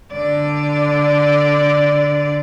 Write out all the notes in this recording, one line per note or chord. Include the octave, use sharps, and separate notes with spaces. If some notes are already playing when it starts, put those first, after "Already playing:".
D3 D5